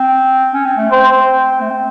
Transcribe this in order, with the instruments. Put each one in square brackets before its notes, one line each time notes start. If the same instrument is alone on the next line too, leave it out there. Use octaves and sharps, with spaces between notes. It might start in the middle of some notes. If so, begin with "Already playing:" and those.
Already playing: [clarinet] C4
C#4
C4
A3
[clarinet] C4 [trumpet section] C5
[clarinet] A3
C4